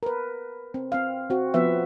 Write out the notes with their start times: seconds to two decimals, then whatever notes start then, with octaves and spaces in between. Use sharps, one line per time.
0.03 A#4 B4
0.74 C4
0.92 C4 F5
1.30 C4 F#4
1.54 F3 B3 E5